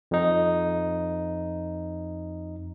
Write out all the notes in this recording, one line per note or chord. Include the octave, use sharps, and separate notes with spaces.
F2 D#4